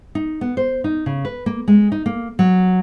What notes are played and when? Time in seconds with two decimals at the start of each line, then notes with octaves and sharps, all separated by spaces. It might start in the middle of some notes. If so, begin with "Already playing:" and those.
0.15 D#4
0.41 B3
0.57 C5
0.84 D#4
1.06 C#3
1.25 B4
1.46 A#3
1.68 G#3
1.92 D#4
2.06 A#3
2.39 F#3